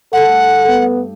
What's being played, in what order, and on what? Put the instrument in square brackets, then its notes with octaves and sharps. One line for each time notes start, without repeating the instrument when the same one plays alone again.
[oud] G2 A3 [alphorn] A4 [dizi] F#5
[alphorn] B3